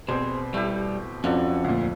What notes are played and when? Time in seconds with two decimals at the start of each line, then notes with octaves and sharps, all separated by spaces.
0.08 B2 G3 C4 G#4 C5
0.54 G3 A3 E4 G4
1.24 F2 C#4 D4 F#4 A4
1.64 D2 A#2